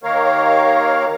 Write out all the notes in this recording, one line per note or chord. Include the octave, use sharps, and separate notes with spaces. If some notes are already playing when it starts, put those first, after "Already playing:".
D#2 D#3 A#3 A#4 C#5 F5